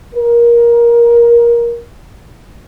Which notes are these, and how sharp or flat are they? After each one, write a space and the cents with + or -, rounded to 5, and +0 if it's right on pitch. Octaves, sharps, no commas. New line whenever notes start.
A#4 +20